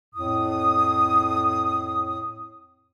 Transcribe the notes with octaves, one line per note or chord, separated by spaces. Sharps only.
F2 A2 D#6